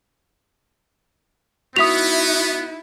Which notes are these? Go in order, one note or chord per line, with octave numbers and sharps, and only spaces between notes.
B3 D#4 E4 F#4 E5 D#6 B6 F7